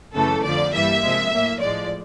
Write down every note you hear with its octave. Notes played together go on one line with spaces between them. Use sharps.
F#2 C#3 E3 A3 A4
F2 D3 F3 D5
G2 E3 G3 A#3 E5
C3 F3 G#3
A2 F#3 A#3
A2 F3 G#3 D5